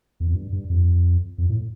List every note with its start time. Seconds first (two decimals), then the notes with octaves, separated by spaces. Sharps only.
0.20 E2
0.28 F2
0.35 G2
0.52 G2
0.70 F2
1.38 F2
1.49 A2